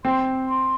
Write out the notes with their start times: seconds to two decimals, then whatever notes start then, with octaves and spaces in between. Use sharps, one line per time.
0.04 C4 C6
0.48 C6